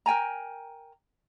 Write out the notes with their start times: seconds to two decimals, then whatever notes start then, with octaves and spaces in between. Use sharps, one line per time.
0.06 A#4 G5 G#5 A#5